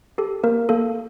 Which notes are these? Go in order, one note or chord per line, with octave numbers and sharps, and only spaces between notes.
G4 A4
A#3 A#4
A#3 A4